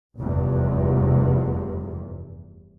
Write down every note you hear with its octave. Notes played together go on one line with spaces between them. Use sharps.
F1 E2 G2 C3